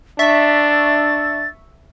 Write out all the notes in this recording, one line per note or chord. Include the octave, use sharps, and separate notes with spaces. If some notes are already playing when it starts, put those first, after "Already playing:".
D4 E5 C#6 A6